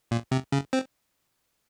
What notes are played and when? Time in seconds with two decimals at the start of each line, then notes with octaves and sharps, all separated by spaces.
0.11 A#2
0.32 C3
0.52 C#3
0.73 C4